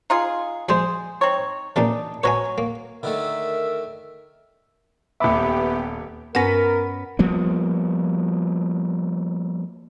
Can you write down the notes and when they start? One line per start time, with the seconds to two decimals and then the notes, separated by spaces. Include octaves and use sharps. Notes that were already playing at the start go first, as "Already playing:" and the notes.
0.10 D#4 F4 G#4
0.69 F3 G#3 G#4 C5
1.21 C4 D#4 C#5
1.76 A#2 C#3 E3 D4 D#4
2.23 F#3 B4 C#5 D#5 G#5
2.58 A#3
3.03 D3 D#3 A3 A#4 E5
5.20 D#1 B3 G4 E5 B5 D6
6.35 G2 B3 C#4 A#4 B4 F#5
7.19 F3 G3 A#3 B3